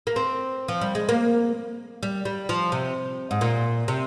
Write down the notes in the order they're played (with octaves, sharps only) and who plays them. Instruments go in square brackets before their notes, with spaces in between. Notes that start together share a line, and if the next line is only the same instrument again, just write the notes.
[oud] A#3
C4
F3
G3
G#3
A#3
G3
G3
F3
C3
G#2
A#2
C3